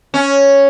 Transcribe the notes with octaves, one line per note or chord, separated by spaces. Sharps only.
C#4